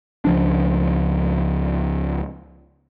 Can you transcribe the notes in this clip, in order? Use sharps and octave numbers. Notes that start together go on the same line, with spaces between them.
C#2 F3 D4